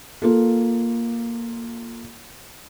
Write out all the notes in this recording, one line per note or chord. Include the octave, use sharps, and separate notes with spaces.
A#3 F4 A4